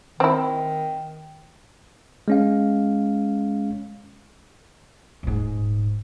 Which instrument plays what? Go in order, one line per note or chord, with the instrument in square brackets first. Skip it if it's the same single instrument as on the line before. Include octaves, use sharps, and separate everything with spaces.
[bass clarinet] D#3 [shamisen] C4 E4
[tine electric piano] G#3 C#4 F5
[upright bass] D#1 G#2